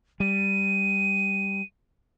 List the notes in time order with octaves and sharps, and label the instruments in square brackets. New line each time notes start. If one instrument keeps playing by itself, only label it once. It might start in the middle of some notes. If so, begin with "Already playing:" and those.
[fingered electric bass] G3 [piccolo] D#7